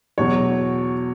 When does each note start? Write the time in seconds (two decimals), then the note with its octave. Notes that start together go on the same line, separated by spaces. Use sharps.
0.18 E2 B2 F#3 C#5